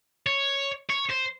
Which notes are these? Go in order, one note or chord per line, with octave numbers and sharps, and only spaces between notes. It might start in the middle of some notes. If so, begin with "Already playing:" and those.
C#5
C#5
C5